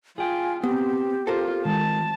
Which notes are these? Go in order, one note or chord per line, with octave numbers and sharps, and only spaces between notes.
F4 G#4 G5 G#5
B3 C4 G4
F4 A4 A#4 C5
D#3 G#3 F4 A5